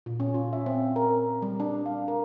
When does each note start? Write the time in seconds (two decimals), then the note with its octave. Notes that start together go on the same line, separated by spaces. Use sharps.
0.06 A#2
0.20 C#4
0.34 F4
0.53 E5
0.66 C4
0.96 A#4
1.42 G3
1.60 D4
1.86 F5
2.08 A#4